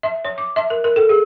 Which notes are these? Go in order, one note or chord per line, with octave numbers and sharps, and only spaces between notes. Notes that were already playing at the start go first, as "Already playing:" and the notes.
E5
C#5
D6
E5
A#4
A#4
A4
G#4